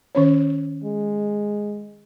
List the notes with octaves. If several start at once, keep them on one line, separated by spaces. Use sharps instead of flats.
D#3 C#4 C#5
G#3